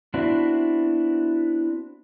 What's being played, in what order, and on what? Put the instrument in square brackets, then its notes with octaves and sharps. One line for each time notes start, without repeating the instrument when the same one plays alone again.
[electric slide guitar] B3 C4 D4 E4 F#4